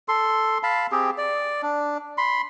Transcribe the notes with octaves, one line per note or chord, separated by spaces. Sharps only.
A4 C6
F5 A5 B5
C4 G4 G#4
D5
D4
B5 C6